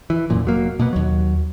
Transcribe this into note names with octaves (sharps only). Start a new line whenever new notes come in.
E3
E1 F#2 A#2
F1 F#3 A#3
B2 A#3 B3
D#2 F#3